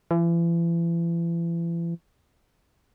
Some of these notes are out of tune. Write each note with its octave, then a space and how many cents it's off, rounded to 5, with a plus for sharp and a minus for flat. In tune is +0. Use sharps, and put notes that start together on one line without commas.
E3 +40